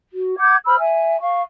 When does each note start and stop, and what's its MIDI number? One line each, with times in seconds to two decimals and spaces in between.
0.12 0.38 66
0.38 0.56 78
0.38 0.56 86
0.38 0.56 91
0.38 0.56 92
0.66 0.78 72
0.66 0.78 83
0.66 0.78 88
0.66 0.78 89
0.79 1.20 76
0.79 1.20 80
1.21 1.42 77
1.21 1.42 85